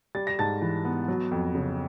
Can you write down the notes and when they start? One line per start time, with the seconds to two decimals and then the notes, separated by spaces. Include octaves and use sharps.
0.15 G3 A6
0.27 A#6
0.39 G#2 A5 A6
0.62 E3
0.85 B3
1.08 F#3
1.31 F2
1.55 C#3